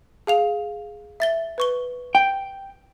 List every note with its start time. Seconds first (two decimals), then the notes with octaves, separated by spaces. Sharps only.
0.27 G#4 F5 F7
1.20 E5 A6 G7
1.58 B4 C#6 G7
2.15 G5